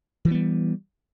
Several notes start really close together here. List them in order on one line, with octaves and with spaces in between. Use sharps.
E3 F3 B3 G3